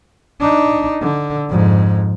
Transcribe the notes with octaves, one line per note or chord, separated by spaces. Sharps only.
D4 D#4
D3
F2 G#2